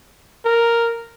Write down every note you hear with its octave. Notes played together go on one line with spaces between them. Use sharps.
A#4